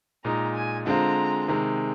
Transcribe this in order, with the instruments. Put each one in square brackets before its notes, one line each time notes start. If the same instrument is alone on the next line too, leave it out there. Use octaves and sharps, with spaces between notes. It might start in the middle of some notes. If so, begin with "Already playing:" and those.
[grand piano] A#2 G#3 D#4 [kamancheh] A#5
[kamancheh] G#5
[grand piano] D3 G#3 C4 F4 C5 [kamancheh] A#5
[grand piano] C3 D#3 G#3